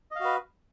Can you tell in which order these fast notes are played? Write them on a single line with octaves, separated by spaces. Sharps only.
D#5 F5 F#4 B4